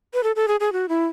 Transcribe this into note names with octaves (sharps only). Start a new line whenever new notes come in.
B4
A4
A4
G#4
G#4
F#4
E4